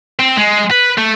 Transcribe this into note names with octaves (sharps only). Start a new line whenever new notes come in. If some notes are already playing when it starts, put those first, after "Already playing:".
C4
G#3
B4
A3